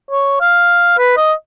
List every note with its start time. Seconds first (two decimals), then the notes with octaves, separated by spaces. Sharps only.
0.11 C#5
0.41 F5
0.98 B4
1.17 D#5